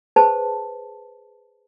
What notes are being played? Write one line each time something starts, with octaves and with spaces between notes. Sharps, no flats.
G#4 B4 C5 A5